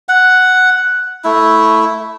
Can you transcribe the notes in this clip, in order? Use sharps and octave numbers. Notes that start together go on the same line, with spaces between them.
F#5
A3 E4